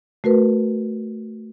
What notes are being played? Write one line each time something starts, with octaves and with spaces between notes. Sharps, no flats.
A3 F#4 A#4 B4